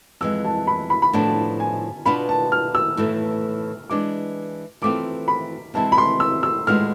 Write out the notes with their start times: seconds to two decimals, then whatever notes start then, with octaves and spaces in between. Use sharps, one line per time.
0.21 F2 E3 G#3 E6
0.45 A5
0.67 B5
0.90 B5
1.02 B5
1.13 A2 F3 B3 D4 A5
1.60 G#5
2.06 B2 B3 D4 F4 B5
2.29 A5
2.52 F6
2.75 E6
2.97 A2 E3 A3
3.90 E3 G#3 D4 D6
4.82 E3 A3 C4 F4 D6
5.28 B5
5.74 C3 E3 G#3 C4 E4 A5
5.92 B5
5.98 C6
6.20 E6
6.43 E6
6.67 A2 G#3 B3 D4 F4 F6